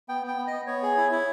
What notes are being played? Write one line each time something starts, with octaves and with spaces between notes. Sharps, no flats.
B3 G5
B3
G5
B3
D#5
B3
B3 C#5
G#4
E4
E4